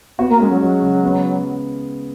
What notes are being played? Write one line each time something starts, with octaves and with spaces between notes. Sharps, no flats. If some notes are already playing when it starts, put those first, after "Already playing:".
B3 F#4
A#3
G#3 C#4
F#3
F#3 G#3
C#3
B3